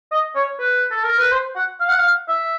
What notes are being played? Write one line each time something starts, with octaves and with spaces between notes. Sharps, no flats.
D#5
C#5
B4
A4
A#4
B4
C5
F#5
F5
F#5
F5
E5